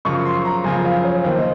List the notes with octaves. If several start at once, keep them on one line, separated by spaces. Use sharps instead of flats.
F#2 C#3 F3 C#6
C6
A#5
F#2 C#3 F3 G#5
F5
C#5
D#2 D#3 A#3 C5
D#5